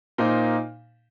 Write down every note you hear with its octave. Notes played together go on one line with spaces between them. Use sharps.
A#2 A#3 D#4 C5